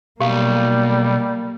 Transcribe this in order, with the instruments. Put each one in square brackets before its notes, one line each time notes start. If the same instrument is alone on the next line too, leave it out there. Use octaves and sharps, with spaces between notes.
[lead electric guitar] B1 [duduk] G3 [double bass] A#3 [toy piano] G4 F5